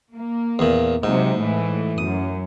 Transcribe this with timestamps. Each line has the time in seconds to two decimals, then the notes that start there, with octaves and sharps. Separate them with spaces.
0.15 A#3
0.59 E2 A#2
1.03 G#2 C3 F#3 D#4
1.40 A2 E3 A3
1.98 F#2 D#6